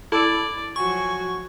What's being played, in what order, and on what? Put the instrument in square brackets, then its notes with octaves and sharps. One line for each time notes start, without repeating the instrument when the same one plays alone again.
[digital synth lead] E4 [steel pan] A4 [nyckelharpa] D5
[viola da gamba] F3 F#3 F#4 [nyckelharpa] G#5 [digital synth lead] C#6